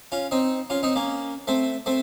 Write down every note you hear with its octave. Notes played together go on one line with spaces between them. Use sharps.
C#4 F4
C4 D#4
C#4 F4
C4 D#4
A#3 C#4
A3 C4
A3 C4